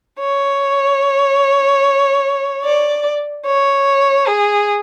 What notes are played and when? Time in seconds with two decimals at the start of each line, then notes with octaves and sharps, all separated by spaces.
0.19 C#5
2.64 D5
3.47 C#5
4.28 G#4